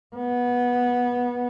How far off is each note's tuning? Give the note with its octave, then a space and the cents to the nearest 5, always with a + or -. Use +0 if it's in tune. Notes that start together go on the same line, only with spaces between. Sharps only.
B3 -15